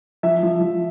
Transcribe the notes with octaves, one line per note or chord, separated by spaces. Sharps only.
F3 E5
F3
F3